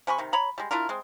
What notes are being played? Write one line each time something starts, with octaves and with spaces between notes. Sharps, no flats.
C3 G#5 B5 C#6
C3 D#3
C#5 A#5 B5
G3 G#3
D4 E4 F4 A#4
G#3 C4